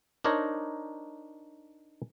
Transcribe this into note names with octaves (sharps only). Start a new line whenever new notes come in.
D4 D#4 A#4 C5 C#5 A#5